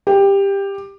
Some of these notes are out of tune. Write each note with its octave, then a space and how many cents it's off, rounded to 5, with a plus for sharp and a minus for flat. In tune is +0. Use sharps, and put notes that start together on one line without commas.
G4 +15